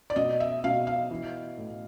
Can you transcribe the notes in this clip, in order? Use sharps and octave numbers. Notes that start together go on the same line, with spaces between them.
D5
B2 D#5
E5
B2 F5
F5
E3
A2